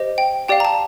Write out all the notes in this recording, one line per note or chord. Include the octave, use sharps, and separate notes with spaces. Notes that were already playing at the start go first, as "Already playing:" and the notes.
Already playing: G4 C5 D#5
G5
G4 D5 F5 G5
A#5
A5